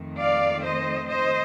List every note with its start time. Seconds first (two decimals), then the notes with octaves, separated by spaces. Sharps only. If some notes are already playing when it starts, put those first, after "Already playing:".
Already playing: F2 D#3 A3
0.19 D5 F5
0.64 C5 D#5
1.09 C5 D#5